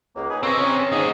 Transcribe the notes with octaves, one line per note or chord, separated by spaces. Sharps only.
C#2 A#3
D#4 G#4 B4 G#5
F2 C4 C#5 A#5 E6
C#4
D#2 G#2 G#4 D#5